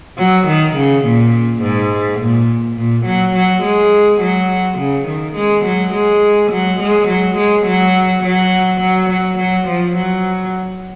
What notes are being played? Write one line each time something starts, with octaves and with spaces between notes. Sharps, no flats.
F#3
D#3
C#3
A#2
G#2
A#2
A#2
F#3
F#3
G#3
F#3
C#3
D#3
G#3
F#3
G#3
F#3
G#3
F#3
G#3
F#3
F#3
F#3
F#3
F#3
F3
F#3